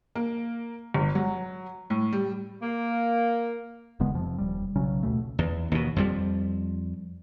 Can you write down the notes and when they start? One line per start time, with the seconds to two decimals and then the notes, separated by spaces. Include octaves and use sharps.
0.15 A#3
0.94 G1
1.15 F#3
1.90 A2
2.13 G3
2.62 A#3
4.00 E1 C#3 G#3 B3
4.15 F2 C3 F3
4.38 D#1 G3
4.76 B1 C#3 F#3 C#4
5.03 D#2 B2 A3
5.39 E2
5.72 D#2 B2
5.96 F2 F3 G3